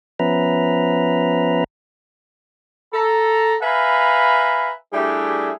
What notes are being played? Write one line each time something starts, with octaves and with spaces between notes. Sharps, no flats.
F3 B3 C#4 B4 E5 A#5
A4 A#5
B4 E5 F5 G#5 A#5 B5
G3 A3 D4 E4 G4 G#4